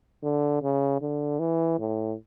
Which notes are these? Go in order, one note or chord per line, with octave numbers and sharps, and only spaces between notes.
D3
C#3
D3
E3
A2